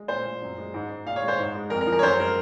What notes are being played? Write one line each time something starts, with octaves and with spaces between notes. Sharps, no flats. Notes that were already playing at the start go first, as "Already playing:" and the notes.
Already playing: G#3
A#2 C5
A#2
F#2
G#3
G#2
G#2
A#2 F5
C#5
G#3
C5
G#2
G#3
F2 A#4
A#4
F3
A#4
C#5
F#2 C5
G#3 A#4